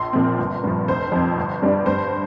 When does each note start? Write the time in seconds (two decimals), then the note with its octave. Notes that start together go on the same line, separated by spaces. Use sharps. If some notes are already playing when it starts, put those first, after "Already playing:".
Already playing: A#1 C6
0.13 A#2 F3 C4
0.38 G1
0.64 G2 F3
0.88 F1 C5
1.12 F2 F3 C4
1.38 G1
1.62 G2 G3 D4
1.86 G2 C5